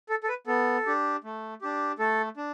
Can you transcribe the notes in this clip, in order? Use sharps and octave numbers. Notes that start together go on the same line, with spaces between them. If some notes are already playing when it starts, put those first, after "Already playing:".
A4
A4
B4
B3 A4
D4 G4
A3
D4 G4
A3 A4
D4